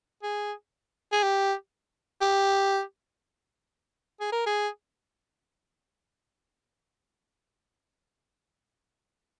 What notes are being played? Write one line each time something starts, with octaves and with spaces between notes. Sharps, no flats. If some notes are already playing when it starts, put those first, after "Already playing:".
G#4
G#4
G4
G4
G#4
A#4
G#4